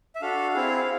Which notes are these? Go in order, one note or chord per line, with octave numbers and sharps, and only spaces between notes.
E5
D4 F#4 A4 F5
C4 E4 G#4